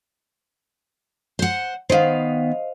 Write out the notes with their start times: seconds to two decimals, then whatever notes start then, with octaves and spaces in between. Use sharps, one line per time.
1.39 C5 F#5
1.90 D#3 B3 C5 D#5 F5